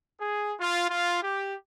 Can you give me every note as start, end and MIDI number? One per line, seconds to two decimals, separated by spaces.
0.20 0.54 68
0.60 0.86 65
0.90 1.19 65
1.23 1.55 67